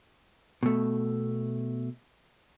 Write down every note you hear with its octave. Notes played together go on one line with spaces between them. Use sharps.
B2 A3